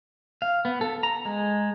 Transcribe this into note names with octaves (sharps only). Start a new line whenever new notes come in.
F5
B3
A4
A#5
G#3